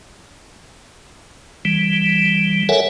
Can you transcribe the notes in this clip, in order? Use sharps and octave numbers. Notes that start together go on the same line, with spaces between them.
E3 G3
A4 A#4 C#5 E5 F#5 G#5